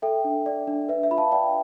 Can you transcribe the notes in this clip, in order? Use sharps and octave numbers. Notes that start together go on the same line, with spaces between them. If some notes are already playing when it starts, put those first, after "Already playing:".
A4 E5 G5
D4
D5
D4
B4 E5
E5
F4 B5
F5 A5
D5 G5 B5